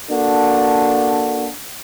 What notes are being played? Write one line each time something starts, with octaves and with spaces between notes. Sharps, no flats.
A#3 D4 F#4 A4